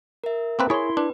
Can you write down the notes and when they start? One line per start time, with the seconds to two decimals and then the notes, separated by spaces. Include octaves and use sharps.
0.24 A#4 E5
0.59 A#3 C4 B4
0.70 E4 G#4 C#5 C6
0.97 D4 B4